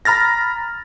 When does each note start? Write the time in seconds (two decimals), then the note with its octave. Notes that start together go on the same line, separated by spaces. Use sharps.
0.05 A#5 B5 F6 A6 A#6